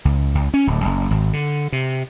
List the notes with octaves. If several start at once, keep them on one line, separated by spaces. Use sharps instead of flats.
C#2
C#2
C#4
D1
F#1
G#1
D3
C3